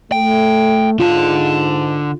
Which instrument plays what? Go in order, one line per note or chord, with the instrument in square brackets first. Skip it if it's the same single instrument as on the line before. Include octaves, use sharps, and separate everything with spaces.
[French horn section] A3 [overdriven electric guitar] G5
[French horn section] G#2 [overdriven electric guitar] D3 A5 [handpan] F4